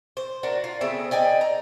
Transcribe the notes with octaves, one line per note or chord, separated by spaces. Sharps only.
C5
D4 F#4 A#4
F4
C#3 A3 B3 C4
D#4 D5 G5 G#5
A#5